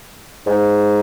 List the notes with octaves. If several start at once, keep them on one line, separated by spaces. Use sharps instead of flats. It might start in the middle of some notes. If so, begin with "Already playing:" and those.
G#2